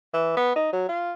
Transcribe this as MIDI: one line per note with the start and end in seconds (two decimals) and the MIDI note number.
0.14 0.32 52
0.37 0.54 59
0.56 0.72 63
0.73 0.87 54
0.89 1.14 65